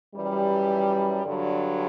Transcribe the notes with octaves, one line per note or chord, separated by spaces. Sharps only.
F#2 E3 G3
G2 D3 F#3